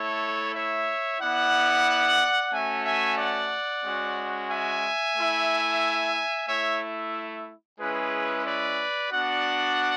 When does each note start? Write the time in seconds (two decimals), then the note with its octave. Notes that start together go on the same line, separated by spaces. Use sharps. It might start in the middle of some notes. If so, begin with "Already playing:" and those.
Already playing: A3 E4 A4 C#5
0.55 C#5 E5
1.21 B3 E4 D5 F#5
2.52 A3 C#4 F#4 E5 G#5
2.85 E5 G#5
3.18 D5 F#5
3.85 G#3 C#4 F#4
4.50 E5 G#5
5.17 A3 E4
6.48 A3 E4 C#5 E5
7.79 G#3 C#4 E4 G#4 B4
8.46 B4 D5
9.12 B3 D4 F#4 D5 F#5